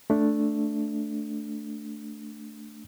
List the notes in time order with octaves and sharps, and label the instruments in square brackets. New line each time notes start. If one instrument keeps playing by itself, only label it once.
[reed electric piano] A3 D4